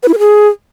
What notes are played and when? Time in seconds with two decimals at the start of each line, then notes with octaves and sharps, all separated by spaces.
0.03 B4
0.08 E4
0.14 A#4
0.19 G#4